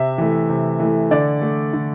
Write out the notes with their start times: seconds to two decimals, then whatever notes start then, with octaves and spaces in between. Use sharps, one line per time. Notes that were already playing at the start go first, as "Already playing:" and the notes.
Already playing: C3 E5
0.18 E3 A3
0.49 C3
0.80 E3 A3
1.11 D3 D5
1.42 A3
1.73 D3